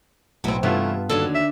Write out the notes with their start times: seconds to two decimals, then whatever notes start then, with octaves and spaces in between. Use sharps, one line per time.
0.44 B1 A2 B3 C4 E4 F#4
0.63 G2 C3 E3 A3 B3 C#4 F4 E5
1.09 D#2 D3 F#3 D4 A4
1.35 E5